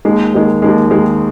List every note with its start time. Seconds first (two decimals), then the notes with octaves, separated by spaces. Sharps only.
0.05 D#2 D#3 G#3
0.33 D#2 D#3 G#3
0.62 D#2 D#3 G#3
0.91 D#2 D#3 G#3